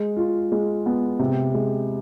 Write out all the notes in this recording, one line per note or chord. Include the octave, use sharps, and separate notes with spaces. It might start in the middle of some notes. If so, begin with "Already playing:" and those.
Already playing: G#3
F4
G#3
B3
C3
G#3